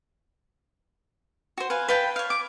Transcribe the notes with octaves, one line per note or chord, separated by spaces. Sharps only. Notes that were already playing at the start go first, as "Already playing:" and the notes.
F#4 C5
B4 F5 G#5
B4 F5 G5 A5
C#5 F5
D6